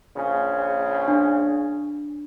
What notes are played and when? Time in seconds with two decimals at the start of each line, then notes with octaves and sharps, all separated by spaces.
0.15 A#1 C#3
1.08 D4